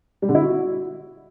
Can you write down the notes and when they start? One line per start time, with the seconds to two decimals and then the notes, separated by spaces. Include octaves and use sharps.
0.22 G3
0.29 D3
0.35 E4
0.41 F#4